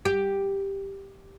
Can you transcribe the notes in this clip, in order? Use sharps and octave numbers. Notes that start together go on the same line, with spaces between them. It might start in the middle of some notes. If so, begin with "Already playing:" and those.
G4